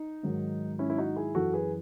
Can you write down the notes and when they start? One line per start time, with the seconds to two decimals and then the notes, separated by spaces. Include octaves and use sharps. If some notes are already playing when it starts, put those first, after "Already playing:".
Already playing: D#4
0.23 G#2 D#3 F#3
0.79 C#4 E4
0.90 E4
0.98 D#4 F#4
1.16 E4 G#4
1.35 F#2 E3 F#4 A4
1.53 G#4 B4